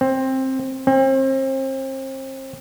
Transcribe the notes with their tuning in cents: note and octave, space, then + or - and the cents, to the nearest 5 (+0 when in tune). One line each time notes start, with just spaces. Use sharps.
C4 +15
C4 +35